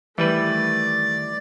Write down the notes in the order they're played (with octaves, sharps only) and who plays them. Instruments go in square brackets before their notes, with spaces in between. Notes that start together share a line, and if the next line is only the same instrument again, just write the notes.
[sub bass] D#3 [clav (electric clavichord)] E3 G3 B4 [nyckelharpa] A3 [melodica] D5